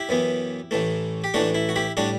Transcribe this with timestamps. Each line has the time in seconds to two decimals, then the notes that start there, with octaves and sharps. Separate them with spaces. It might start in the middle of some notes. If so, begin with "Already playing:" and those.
Already playing: E4 G4
0.09 F#2 E3 B3
0.71 A1 A2 E3 A3
1.24 G4
1.34 A1 A2 E3 A3 D4 F#4
1.55 E4
1.69 F#4
1.76 E4 G4
1.97 A2 G3 D4 F#4